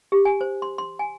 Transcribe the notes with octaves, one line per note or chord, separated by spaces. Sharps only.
G4
G#5
C5
C6
C6
G#5